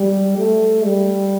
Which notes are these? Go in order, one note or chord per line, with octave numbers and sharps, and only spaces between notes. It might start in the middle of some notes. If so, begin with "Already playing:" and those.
Already playing: G3
A3
G3